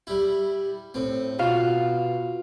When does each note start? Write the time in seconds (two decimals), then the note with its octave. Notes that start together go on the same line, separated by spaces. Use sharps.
0.07 G3 E4
0.94 A2 C4
1.39 B2 F4 F#4 F5